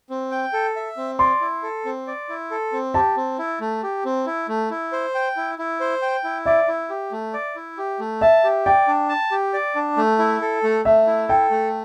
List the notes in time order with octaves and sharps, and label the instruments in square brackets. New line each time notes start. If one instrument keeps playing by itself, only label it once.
[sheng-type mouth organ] C4
G5
A4
E5
C4
[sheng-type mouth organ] D5 [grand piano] C6
[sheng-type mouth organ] E4
A4
C4
D5
E4
A4
C4
[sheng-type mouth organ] G4 [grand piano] A5
[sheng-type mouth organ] C4
E4
A3
G4
C4
E4
A3
E4
C5
G5
E4
E4
C5
G5
E4
[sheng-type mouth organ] D5 [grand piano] E5
[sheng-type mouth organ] E4
G4
A3
D5
E4
G4
A3
[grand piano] E5 [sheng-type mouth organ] A5
[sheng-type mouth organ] G4
[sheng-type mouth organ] D5 [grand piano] G5
[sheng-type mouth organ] D4
A5
G4
D5
D4
A3
E4
A4
A3
[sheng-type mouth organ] A3 [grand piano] E5
[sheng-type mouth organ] E4
[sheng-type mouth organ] A4 [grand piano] G5
[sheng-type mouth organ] A3